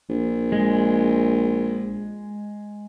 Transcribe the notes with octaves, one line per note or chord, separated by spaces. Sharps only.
A#1
G#3